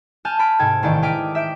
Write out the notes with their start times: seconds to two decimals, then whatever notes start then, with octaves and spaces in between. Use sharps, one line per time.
0.25 G#5 A5 F6 G6
0.39 B5 F6 A6 D7
0.59 G#2 C3 A4 G5 G#6
0.83 A1 D#3 A3 D5 G6
1.02 G#4 G5 D6 F6 B6 D7
1.35 E5 G6 D7